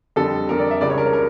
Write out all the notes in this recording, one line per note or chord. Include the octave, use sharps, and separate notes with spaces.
F2 D3 G3 A4
F2 D3 G3 A#4
D5
E5
C#2 C#3 G3 D5
C#5
A#4
C#5
A#4